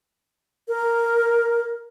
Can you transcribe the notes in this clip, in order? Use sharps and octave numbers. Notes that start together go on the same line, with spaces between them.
A#4